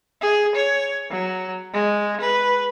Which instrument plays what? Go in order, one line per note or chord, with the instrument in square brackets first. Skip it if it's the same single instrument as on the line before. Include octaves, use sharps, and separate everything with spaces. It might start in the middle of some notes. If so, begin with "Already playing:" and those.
[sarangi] G#4
C#5
F#3
G#3
B4